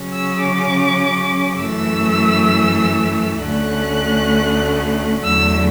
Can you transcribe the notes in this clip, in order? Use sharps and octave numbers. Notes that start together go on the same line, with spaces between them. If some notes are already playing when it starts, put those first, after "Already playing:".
Already playing: C#3 F#3 C#4
E6
D6
F#2 E3 A3 E6
D2 D3 A3 C#4 F#6
E2 D3 F#3 A3 E6